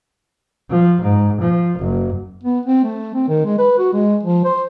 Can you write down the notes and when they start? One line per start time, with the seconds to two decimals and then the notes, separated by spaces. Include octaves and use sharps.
0.70 F3
1.02 G#2
1.41 F3
1.79 F#1
2.43 B3
2.66 C4
2.84 A3
3.14 C4
3.28 D#3
3.45 G#3
3.59 B4
3.78 F#4
3.93 G#3
4.23 F3
4.45 C5